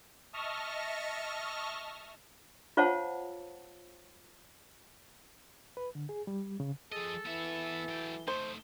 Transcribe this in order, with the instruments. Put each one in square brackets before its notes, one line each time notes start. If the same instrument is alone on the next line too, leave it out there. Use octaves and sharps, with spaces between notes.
[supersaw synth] D#5 E5 A5 C#6 F6 A#6
[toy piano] F4 C5 C#5 F5 F#5 A5
[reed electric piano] B4
D3
G#4
G3
C#3
[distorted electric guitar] F3 D#5 [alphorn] G#4 [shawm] A4
[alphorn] E3 [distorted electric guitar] B3 E5
[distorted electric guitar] F#3 G5
[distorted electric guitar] A3 D#4 [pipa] C5